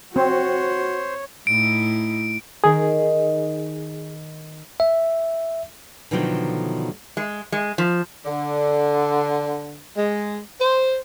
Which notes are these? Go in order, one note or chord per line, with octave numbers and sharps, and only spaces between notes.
C4 F#4 C5 C#5
A2 D#4 E4 D7
D#3 D#4 G#4 A#4
E5
B2 D3 D#3 F3 F#3 A3
G#3
G#3
F3
D3
G#3
C5